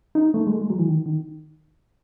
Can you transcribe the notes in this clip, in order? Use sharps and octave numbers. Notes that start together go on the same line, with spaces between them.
D#4
A3
G#3
A3
G#3
F#3
E3
D#3
D#3